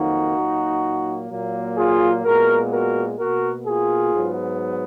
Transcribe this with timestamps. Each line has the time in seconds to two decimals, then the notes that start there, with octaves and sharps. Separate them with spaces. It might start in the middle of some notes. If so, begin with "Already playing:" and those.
Already playing: F2 D#3 F#3 A#3 D#4 F#4
0.36 A#2 F#3 A#3
1.30 A#2 F#3 A#3
1.77 F4 G#4
2.25 A#2 G#3 B3 F#4 A#4
2.72 F#4 A#4
3.19 B2 A#3 F#4 A#4
3.67 F4 G#4
4.14 G#2 F#3 B3